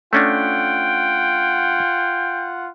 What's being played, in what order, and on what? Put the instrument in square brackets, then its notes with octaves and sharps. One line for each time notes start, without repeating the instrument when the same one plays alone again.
[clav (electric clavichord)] A3 C#4 D4 [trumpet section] F4 F#5 [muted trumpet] G5